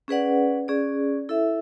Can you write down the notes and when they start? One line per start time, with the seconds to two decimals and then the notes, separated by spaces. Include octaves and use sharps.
0.08 C#4 G#4 B4 D5 F#5
0.68 C#4 G#4 D5
1.29 E4 A4 E5